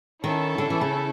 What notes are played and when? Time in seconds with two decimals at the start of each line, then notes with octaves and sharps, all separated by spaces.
0.24 D#3 C#4 E4 A4
0.58 D3
0.70 E3
0.81 C#3